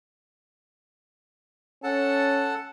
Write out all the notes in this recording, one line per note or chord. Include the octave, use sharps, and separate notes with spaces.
C#4 A4 F#5 A5